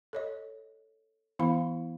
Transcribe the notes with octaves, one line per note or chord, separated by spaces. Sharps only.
A4 C#5 D#5
E3 B3 E4 F5 B5